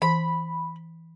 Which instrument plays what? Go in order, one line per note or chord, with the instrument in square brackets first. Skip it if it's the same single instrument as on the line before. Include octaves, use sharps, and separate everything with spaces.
[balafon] E3 [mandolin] B5